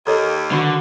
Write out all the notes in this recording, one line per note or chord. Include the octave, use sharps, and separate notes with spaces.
D#2 A4 C#5 D#5
D3 D#3 F#4 B5